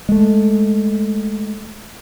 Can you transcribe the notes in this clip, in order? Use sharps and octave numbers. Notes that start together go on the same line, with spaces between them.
G#3 A3